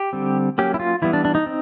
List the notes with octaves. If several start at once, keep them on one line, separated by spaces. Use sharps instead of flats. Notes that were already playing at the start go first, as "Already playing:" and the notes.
Already playing: G4
D3 G3 C4
F#3 A#3 C#4 G4
E4
F4
E3 G3 B3 E4
D4
D4
D#4
C4